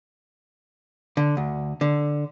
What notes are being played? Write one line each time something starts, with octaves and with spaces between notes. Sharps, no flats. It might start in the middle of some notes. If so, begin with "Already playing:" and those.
D3
D2
D3